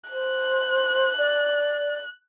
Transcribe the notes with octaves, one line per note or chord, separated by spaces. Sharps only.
C5 F#6
D5